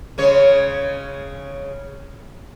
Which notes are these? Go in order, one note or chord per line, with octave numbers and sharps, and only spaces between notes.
C#3 G#3 C#5